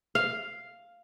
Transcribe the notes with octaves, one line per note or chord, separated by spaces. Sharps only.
F5